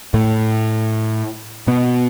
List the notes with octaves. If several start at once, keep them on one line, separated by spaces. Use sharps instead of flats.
A2 A3
B2 B3